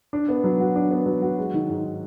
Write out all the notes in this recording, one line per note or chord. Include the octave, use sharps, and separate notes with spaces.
D4
B3
F#3
F#4
D4
B3
F#3
F#4
G#3
D#3
G#2